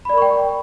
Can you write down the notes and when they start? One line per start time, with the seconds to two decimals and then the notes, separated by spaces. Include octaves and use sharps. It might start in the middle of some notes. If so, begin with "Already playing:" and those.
0.05 B5
0.09 D5
0.14 A#4
0.18 C#6
0.22 G5